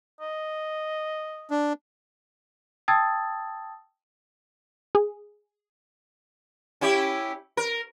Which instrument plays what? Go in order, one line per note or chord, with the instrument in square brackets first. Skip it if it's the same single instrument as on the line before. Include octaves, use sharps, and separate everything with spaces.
[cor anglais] D#5
[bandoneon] D4
[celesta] G5 A5 D#6 E6 G#6 A6
[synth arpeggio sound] G#4
[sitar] C#4 E4 G4
A#4